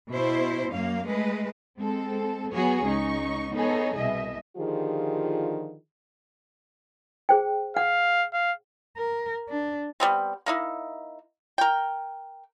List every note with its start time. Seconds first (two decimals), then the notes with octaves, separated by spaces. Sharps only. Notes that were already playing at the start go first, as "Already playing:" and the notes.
0.12 B2 E4 C5
0.71 F#2 A#3 F5
1.07 G#3 A3 B4
1.78 G#3 C4 A4
2.52 F#3 B3 F#4 G#4 C#5
2.84 C#2 C#4 D#4 C#6
3.53 B3 D#4 G#4 A4 C#5
3.96 C2 B2 D#5 E5
4.57 D3 D#3 F3 F4 G4 G#4
7.29 G#4 C5 G5
7.77 F5 F#5
8.34 F5
8.97 A#4
9.49 D4
10.00 G3 B3 C4
10.46 A#3 D#4 E4
11.58 A#4 G5